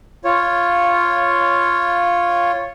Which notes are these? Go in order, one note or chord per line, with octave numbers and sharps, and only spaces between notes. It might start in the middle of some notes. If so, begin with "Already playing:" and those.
F4 C#5